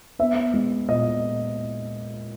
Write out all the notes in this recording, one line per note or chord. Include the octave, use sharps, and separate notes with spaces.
B3 E5
G#3
A#2 D#5